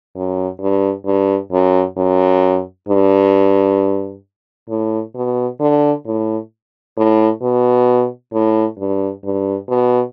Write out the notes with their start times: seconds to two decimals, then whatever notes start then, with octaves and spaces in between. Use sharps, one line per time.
0.16 F#2
0.61 G2
1.06 G2
1.52 F#2
1.97 F#2
2.88 G2
4.69 A2
5.15 B2
5.60 D3
6.06 A2
6.97 A2
7.42 B2
8.33 A2
8.79 G2
9.24 G2
9.69 B2